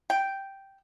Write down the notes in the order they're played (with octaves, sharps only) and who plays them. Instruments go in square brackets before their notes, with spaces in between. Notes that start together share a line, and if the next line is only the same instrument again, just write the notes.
[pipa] G5